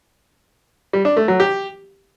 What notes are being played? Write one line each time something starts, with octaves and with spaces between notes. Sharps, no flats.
G3
D4
A3
F#3
G4